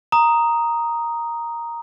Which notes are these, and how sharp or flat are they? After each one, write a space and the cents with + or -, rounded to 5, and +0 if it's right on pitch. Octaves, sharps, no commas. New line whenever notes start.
A#5 +0 D#6 +0